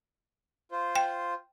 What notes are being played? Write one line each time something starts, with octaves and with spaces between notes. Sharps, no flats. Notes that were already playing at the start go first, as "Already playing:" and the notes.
F4 C5
G5